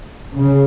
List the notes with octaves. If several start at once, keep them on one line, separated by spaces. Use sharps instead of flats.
C#3